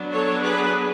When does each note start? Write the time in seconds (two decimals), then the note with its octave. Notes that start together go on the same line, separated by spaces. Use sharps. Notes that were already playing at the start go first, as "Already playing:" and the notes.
Already playing: F#3 B3 D4
0.13 A4 C#5
0.43 G#4 B4